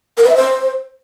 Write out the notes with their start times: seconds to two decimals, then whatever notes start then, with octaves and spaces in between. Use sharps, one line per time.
0.17 A#4
0.23 B4
0.29 E5
0.35 C5